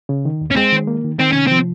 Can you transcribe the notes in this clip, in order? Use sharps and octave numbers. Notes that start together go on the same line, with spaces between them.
C#3
D#3
D#2
C#4
G#3 C4
D#3
A#3
D#3
D#3 C4
C3 C#4
F3 C4